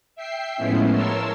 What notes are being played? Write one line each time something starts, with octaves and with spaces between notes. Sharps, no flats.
E5 G5 C7
A2 F3 G#3 B3 C#4 E4
A#4 C#5 A5 C6 E6